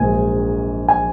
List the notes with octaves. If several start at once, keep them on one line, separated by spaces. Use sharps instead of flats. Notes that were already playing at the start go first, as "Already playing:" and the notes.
Already playing: A#1 G#2 F#3 A#3 G#5
G#5